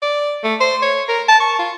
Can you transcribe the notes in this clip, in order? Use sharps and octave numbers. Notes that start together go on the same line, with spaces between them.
D5
A3
C5
C#5
A#4
A5
C#6
F4